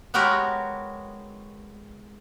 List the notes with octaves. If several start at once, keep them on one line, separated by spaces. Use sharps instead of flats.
G#3 B3 F#4 G4 A#4 C#5